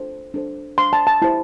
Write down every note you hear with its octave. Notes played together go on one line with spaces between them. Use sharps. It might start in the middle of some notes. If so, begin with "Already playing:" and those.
Already playing: D4 A4 C5
D4 A4 C5
D4 C5 C6
A5
A5
E4 G4 C5 A5